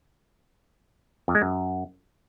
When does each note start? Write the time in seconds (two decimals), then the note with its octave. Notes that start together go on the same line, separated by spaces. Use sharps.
1.28 F2
1.35 G#3
1.42 F#2